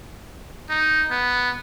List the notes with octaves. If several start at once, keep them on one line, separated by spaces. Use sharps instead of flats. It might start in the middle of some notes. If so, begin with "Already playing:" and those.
D#4
B3